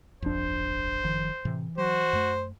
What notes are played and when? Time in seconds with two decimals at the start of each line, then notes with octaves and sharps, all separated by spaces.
0.22 D1 G1 F2 D4 C5
1.03 F#1 D#3 F3
1.45 A2 C3 E3
1.78 F#3 F#4 C5
2.13 F#2 A3